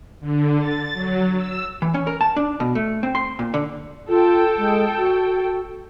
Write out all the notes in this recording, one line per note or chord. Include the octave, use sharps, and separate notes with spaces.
D3
A6
F#3
E6
E3
C#4
A#4
A5
D4
B2
A3
C4
C6
A#2
D3
F4 A4 G5
G#3
F#4